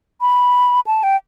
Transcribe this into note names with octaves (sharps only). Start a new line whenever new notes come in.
B5
A5
G5